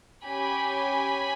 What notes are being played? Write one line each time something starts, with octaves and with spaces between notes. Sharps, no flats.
C#4 G4 G#5 B5